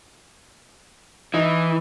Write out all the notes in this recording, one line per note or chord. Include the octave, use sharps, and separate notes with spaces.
E3 D#4